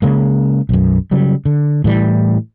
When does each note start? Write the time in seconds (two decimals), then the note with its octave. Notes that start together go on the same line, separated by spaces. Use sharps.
0.02 C#3 G#3 A#3
0.69 B1 F#2
1.11 C#3 F#3 G3
1.45 D3
1.84 A2 E3 G3